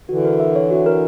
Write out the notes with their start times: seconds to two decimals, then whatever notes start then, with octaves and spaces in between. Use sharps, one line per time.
0.09 D3 E3 F#4
0.25 A#4
0.40 E5
0.56 C#5
0.71 F#4
0.86 A#4